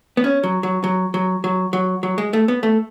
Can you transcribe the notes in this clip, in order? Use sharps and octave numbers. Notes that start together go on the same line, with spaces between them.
B3
C#4
F#3
F#3
F#3
F#3
F#3
F#3
F#3
G#3
A3
B3
A3